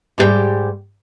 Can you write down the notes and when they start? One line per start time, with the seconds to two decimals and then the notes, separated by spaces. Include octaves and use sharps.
0.18 G#2 G3 E4 G4 G5